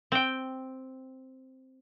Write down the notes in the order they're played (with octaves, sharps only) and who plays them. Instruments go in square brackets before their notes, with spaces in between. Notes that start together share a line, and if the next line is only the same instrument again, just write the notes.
[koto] C4 G5